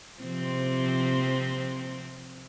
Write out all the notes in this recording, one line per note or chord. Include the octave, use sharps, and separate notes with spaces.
C3 F3 C4